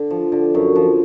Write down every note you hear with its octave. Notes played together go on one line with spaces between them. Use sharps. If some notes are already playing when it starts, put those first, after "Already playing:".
Already playing: D3
F3
D3
F#2
F3